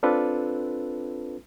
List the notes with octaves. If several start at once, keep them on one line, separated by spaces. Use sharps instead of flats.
C4 D4 F4 A4 B4